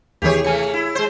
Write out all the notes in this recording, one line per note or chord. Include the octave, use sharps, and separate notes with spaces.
D#2 C3 E3 G4 G#4 C#5
E3 A3 G#5 C#7
E4
G#3 C5